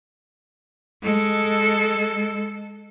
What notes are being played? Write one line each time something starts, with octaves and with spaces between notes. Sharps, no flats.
G#3 A4